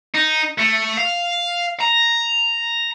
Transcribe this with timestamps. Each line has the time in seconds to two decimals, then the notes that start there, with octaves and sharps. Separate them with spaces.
0.14 D#4
0.58 A3
0.97 F5
1.80 A#5